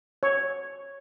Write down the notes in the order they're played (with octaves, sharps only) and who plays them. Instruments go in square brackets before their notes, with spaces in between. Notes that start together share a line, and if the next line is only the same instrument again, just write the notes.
[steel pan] C#5